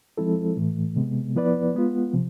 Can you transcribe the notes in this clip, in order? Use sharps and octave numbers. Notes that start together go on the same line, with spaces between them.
F3 G#3 C4 E4 A4
A2 E3 A3
C3 G#3 B3
F3 B3 E4 B4 D5
G#3 B3 F4
C3 F3